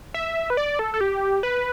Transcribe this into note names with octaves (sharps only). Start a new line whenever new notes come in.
E5
B4
D5
A4
A4
G4
B4